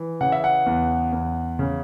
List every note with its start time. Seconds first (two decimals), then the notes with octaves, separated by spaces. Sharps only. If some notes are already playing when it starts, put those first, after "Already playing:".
Already playing: E3
0.21 C#3 F#5
0.32 E5
0.44 F#5
0.66 E2
1.13 E2
1.59 C#3